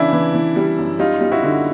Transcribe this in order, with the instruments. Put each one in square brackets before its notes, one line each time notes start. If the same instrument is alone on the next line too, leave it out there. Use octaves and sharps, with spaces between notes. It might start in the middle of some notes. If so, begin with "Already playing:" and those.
Already playing: [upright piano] C#3 E3 [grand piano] D4 E4
[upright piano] E3
E3
G3
F#2
[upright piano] G3 [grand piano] D#4 F4
[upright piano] G3
[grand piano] E4 F#4
[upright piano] D3